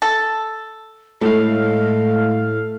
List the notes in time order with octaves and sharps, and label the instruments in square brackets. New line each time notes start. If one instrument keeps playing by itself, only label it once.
[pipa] A4
[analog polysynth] A2 F5 [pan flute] G#3 [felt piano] A3